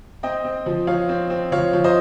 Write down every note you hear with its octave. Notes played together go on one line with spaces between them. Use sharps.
C4 D#5 G5
C4
F3
F3 C#5 F5
C4
C4
F3 C#5 F5
F3
C5 D#5